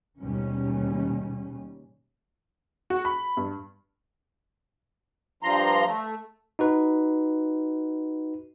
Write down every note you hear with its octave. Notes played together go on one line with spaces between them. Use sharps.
D#2 G#2 B2 G3 C#4
F#4
B5
G2
G2 F3 A#5 C6
A3
D#4 F#4 B4